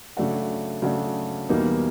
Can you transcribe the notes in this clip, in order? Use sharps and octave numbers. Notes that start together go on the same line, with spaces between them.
C#3 F#3 A3 D4 F#4
C#3 F#3 A3 D4 F#4
E2 B2 G3 A#3 D#4